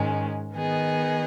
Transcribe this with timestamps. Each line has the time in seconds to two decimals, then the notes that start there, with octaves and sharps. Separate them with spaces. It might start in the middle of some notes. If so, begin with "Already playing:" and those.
Already playing: G#2 D#3 G#3 C#4
0.52 D#3 B3 G#4 D#5